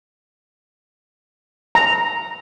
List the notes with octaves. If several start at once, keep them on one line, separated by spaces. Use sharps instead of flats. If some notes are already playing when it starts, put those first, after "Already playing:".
A#5